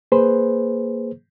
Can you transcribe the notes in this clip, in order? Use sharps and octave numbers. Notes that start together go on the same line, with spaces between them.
A#3 G#4 B4 C5